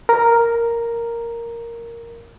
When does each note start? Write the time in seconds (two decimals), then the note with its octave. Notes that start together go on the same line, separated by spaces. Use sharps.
0.09 A#4 A#5